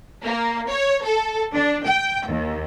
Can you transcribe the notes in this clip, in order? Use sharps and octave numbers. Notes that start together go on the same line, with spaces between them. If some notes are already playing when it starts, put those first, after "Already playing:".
A#3
C#5
A4
D4
G5
D#2